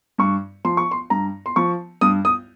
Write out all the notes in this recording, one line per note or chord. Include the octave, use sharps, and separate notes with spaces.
G2 C#6
F3 C6
C#6
C6
G2 A#5
C6
F3 C#6
G2 D#6
D#6